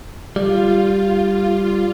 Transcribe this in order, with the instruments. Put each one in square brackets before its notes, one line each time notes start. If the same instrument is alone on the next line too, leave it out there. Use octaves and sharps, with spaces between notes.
[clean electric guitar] G3 [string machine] F4